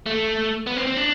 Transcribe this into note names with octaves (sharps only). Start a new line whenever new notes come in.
A3
B3
C4
C4
D4